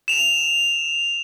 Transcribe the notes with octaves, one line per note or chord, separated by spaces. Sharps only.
E7 F7